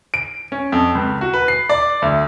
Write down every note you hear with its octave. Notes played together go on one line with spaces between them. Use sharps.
D7
C#4
F2
C#2
F#4
B4
C7
D5
D2